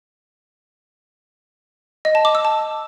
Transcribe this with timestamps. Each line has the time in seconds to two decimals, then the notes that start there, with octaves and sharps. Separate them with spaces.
2.05 D#5
2.15 A5
2.25 D6
2.35 E6
2.45 A5